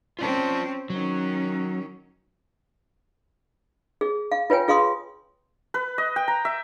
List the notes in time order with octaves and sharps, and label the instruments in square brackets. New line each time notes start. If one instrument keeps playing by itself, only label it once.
[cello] C4 C#4 [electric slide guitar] F4 D5 A5
[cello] D#3 C#4 [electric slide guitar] F#3
[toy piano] G#4
F5
F4 B4 C#5 G5 G#5
F4 G#4 F5 C6 D#6
[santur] B4
D#5
G5
A#5
E5